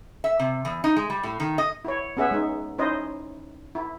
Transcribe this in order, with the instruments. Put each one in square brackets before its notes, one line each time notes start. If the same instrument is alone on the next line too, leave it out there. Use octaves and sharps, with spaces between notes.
[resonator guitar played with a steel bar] E5
C3
E2
D#4
G#3
G3
A2
D#3
D#5
[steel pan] E4 C#5
B3 C#4 G#4 E5 F#5
G#3 D#4
C#4 D#4 E4 C5 D#5
E4